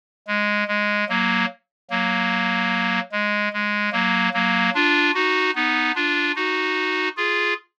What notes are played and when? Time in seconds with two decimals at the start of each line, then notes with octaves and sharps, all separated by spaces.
0.27 G#3
0.68 G#3
1.09 F#3 A#3
1.90 F#3 A#3
3.12 G#3
3.53 G#3
3.92 F#3 A#3
4.33 F#3 A#3
4.75 D4 F4
5.14 D#4 F#4
5.55 B3 D#4
5.95 D4 F4
6.36 D#4 F#4
7.17 F4 G#4